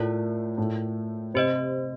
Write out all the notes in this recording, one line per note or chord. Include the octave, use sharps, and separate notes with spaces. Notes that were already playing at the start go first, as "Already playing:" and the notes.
Already playing: A2 A3 F4 A#4 D5
A2 A3
C3 C4 G4 C5 D#5